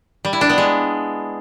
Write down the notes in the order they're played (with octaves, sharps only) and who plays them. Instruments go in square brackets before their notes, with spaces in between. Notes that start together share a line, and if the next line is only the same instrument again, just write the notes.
[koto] G3
E4
D4
B3
G#3